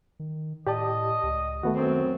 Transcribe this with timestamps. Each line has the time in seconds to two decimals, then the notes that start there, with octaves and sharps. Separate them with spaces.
0.20 D#3
0.67 A2 G4 D5 D#5 A5
1.23 C#2
1.63 D#3 A3 B3 F#4
1.75 F#2 C4